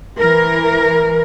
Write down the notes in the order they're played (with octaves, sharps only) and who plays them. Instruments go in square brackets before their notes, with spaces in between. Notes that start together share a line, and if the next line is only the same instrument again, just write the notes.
[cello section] E3 A#4